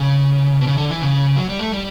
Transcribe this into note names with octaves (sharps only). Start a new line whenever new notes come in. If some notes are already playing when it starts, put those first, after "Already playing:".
Already playing: C#3
B2
C#3
D3
E3
C#3
F#3
G3
A3
G3